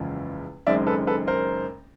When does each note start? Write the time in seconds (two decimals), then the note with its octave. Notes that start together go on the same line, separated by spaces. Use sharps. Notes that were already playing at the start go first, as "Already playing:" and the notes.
Already playing: F#1 E2 C#3 F3 G#3
0.67 F#1 F#2 D#3 G#3 C4 D5 E5
0.87 A4 B4
1.07 A4 B4
1.27 A#4 C5